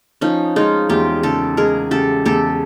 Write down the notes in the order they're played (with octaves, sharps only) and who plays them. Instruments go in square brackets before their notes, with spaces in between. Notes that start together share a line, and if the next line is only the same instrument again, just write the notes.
[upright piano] F3 [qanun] C#4 D#4
[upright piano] G#3 [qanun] D#4 F4
[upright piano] E2 [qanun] F4 G4
[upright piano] C#3 [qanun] G4 A4
[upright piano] G#3 [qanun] G#4 A#4
[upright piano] C#3 [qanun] G4 A4
[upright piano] E2 [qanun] G4 A4